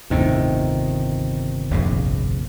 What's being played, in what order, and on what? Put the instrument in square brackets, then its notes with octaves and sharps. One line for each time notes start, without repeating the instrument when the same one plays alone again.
[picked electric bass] G1 C3 D#3 [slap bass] D#2 A2
[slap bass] F1 A#1 G#2